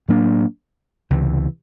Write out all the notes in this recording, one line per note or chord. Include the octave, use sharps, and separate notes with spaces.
A2 F#3 A#3 D4
C#2 C3 E3